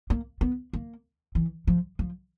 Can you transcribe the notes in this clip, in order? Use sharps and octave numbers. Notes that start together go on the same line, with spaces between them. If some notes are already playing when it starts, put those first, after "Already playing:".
A#3
B3
A#3
E3
F3
F3